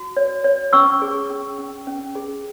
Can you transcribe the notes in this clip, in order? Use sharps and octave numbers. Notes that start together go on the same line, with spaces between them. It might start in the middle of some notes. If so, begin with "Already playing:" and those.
Already playing: F#4
C#5
C#5
C#4 C#6 E6
G#4
C#4
C#4
C#4
G#4